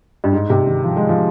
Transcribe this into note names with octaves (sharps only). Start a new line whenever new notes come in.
G2
G#2
C3
D#3
F3
G#3
F3